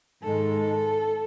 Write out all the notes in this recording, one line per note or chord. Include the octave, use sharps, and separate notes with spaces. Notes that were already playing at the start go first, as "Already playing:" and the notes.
G#2 D#3 G#3 A4